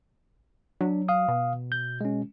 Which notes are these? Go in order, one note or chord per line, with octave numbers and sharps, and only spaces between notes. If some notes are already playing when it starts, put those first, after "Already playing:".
F#3 D4
F5 D#6
B2
G6
G#3 C#4